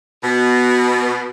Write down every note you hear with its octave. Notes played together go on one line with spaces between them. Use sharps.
B2